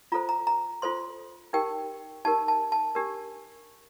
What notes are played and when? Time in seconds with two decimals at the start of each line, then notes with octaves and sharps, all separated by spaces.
0.12 F4 A4 C5 A#5
0.29 A#5
0.47 A#5
0.82 F4 A4 C5 C6
1.53 D#4 G4 A#4 G5
2.25 D#4 G4 A#4 A5
2.48 A5
2.72 A5
2.95 D4 G4 A#4